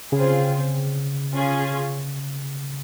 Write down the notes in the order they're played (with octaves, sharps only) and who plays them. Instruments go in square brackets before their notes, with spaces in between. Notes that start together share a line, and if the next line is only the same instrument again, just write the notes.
[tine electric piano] C#3 [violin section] C4 F4 G#4
[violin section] C#4 F4 G#4